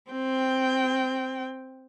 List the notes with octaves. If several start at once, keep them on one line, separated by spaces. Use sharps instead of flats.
C4 G5